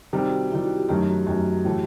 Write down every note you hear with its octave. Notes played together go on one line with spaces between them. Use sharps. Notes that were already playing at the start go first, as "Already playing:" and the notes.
C3 D#3 G3 G4
F#4
G4
C3 D#3 G3 E4
F#4
G4
F#2 D#3 F#3 A3 G4
F#4
F#2 D#3 F#3 A3 F#4
A2 E3 A3